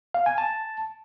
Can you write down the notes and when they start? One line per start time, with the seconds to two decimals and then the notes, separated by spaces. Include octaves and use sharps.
0.14 F5
0.26 G#5
0.38 A5